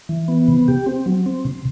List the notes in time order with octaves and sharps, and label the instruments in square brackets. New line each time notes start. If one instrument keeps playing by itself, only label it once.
[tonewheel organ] E3
B3
C3
G4
C4
F#3
C4
C3